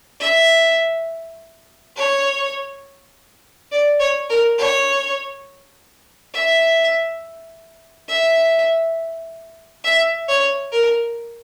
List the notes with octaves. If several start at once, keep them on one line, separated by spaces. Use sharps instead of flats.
E5
C#5
D5
C#5
A#4
C#5
E5
E5
E5
C#5
A#4